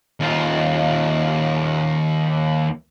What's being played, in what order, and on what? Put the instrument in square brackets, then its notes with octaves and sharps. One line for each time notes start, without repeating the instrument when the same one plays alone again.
[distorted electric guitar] D#2 F4